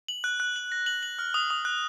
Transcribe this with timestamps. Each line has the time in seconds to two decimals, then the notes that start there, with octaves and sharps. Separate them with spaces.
0.08 F#7
0.24 F#6
0.40 F#6
0.56 F#7
0.72 A#6
0.86 F#7
1.03 F#7
1.19 F6
1.34 D#6
1.50 D#6
1.65 F#6